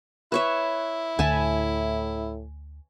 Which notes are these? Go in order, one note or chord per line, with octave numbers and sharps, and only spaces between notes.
E4 B4 C#5 E5
D2 A2 G#5 A5 B5